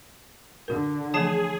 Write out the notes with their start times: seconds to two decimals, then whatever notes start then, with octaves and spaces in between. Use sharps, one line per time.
0.68 D3 F#4 A#4
1.14 E3 F3 A3 G#4 C#5 A5 C7